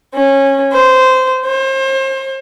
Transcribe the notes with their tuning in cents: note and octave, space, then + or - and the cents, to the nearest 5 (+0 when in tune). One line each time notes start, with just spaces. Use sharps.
C#4 -20
C5 -15
C5 +35